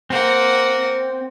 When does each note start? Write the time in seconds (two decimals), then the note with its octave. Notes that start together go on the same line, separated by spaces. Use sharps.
0.10 A#3 C4 F#5